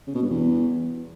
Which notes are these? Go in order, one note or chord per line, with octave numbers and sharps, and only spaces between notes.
C#3
B2
G2
E2